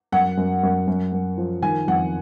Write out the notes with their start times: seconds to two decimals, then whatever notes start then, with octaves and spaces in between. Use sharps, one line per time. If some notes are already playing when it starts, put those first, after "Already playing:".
0.12 F#2 F#5
0.37 F#2
0.63 F#2
0.87 F#2
1.12 F#2
1.38 F3
1.62 D#3 G#5
1.88 F2 F#5